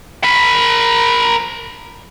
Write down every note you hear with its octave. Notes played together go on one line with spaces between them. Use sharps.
A#4 B5